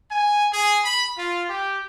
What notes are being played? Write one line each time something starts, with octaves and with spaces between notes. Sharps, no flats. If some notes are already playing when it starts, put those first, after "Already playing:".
G#5
G#4
B5
F4
G4